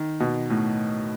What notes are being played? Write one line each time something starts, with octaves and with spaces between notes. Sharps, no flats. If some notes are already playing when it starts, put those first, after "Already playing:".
Already playing: D#3
B2
A2